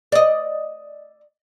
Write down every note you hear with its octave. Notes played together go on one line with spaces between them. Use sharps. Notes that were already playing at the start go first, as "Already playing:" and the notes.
D5 D#5